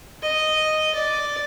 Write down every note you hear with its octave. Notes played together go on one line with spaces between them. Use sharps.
D#5
D5